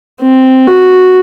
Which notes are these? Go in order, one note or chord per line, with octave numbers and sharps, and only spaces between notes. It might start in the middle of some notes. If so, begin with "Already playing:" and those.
C4
F#4